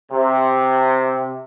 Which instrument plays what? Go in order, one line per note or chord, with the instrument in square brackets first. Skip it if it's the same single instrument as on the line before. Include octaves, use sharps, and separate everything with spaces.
[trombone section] C3